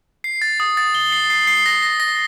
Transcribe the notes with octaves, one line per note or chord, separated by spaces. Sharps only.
C7
A6
D#6
A6
G7
C7
C7
C7
A#6
A#6
A#6